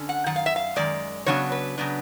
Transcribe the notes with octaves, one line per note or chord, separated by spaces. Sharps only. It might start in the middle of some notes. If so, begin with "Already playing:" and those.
Already playing: D3 C#4
F#5
F#2 D#3 F#5
F5
E5
F5
F#2 D#3 G#3 D5
C#3 F#3 B3 D4 C#5
B4
C#3 F#3 B3 D4